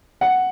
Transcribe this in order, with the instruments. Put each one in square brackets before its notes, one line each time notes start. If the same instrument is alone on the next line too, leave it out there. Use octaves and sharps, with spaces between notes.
[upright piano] F#5